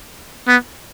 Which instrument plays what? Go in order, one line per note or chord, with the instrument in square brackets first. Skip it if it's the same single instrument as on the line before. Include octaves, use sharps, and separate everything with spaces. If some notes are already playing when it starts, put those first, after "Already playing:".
[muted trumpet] B3